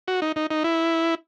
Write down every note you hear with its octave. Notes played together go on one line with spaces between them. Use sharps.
F#4
D#4
D#4
D#4
E4